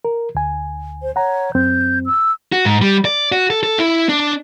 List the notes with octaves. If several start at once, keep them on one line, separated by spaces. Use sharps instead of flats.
A#4
D2 G#5
C5
C#5 F#5 A#5
F#2 C4 G6
E6
F#4
G#2
G3
D5
F#4
A4
A4
E4
D4